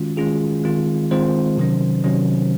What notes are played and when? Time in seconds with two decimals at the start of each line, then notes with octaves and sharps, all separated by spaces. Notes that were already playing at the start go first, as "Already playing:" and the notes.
Already playing: D#3 G#3 C#4 F4 F#4
0.17 D#3 G#3 C#4 F4 G#4
0.64 D#3 G#3 C4 F4
1.11 D#3 G#3 C4 F4 C5
1.58 C3 D#3 F#3 C#4
2.04 C3 D#3 F#3 C#4